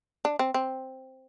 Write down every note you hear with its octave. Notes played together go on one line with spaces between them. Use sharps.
D4
C4
C4